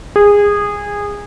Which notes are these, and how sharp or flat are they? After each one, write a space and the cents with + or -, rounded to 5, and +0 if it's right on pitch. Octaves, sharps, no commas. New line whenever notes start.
G#4 -20